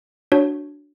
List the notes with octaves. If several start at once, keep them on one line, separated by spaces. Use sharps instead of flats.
D4 F#4 C#5